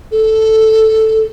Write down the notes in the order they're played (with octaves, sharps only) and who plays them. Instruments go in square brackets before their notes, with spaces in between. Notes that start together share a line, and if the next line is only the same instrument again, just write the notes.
[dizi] A4